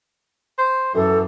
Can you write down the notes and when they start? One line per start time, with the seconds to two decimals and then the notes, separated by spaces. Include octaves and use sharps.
0.58 C5
0.94 F#2 E3 A4